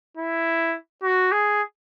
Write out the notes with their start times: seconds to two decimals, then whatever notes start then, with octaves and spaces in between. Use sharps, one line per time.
0.17 E4
1.03 F#4
1.32 G#4